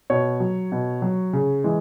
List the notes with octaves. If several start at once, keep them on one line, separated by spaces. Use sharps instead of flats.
B2 C#5
F#3
B2
F#3
C#3
E3 G#3